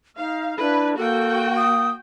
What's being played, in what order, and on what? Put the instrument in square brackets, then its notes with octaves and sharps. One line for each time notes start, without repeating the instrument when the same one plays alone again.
[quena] D#4 [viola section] F5
[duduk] D4 [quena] E4 [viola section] B4
[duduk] A#3 [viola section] F#4 G5 [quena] A4
[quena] D#6